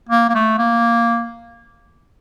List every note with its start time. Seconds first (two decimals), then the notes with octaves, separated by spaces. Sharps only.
0.09 A#3
0.29 A#3
0.35 A3
0.58 A#3